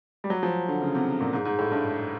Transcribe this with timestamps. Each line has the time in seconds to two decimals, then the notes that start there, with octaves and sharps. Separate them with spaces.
0.24 G3
0.30 F#3
0.43 F3
0.68 D3
0.82 C#3
0.95 C3
1.21 A#2
1.33 G#2
1.45 G#2
1.59 A2
1.72 G2